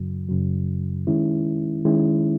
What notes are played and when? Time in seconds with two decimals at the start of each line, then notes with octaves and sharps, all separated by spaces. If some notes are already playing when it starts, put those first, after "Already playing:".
Already playing: F#2 C#3 F#3
0.28 F#2 C#3 F#3
1.07 D#3 G#3 C#4 E4
1.85 D#3 G#3 C#4 E4